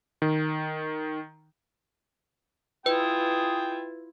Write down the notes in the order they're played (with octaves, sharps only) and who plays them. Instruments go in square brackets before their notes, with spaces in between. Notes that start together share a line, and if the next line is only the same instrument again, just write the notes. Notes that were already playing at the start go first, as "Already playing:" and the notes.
[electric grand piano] D#3
[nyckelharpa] E4 F4 [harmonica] G#4 G5 [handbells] B4